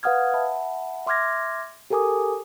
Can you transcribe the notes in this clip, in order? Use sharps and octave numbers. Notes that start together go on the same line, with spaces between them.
B4 F5 F#5 D#6 F6 G#6
E5 F#5 A5 B5
E5 C6 D6 F6 G#6 A#6
G4 A4 A#4 G#5 D6 D#6